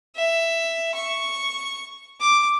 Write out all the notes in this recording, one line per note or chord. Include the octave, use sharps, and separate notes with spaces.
E5
C#6
D6